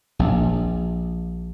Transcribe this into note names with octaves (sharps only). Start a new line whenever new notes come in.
A#1